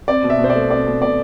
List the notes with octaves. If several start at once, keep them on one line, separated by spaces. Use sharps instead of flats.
C4 D5
B2
E5
B2
C5
D5
A3
C4 D5
B2
B2 D5